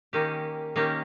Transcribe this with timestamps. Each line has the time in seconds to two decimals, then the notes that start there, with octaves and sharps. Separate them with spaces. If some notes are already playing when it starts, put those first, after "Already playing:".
0.13 D#3 A#3 C#4 G4
0.76 D#3 A#3 C#4 G4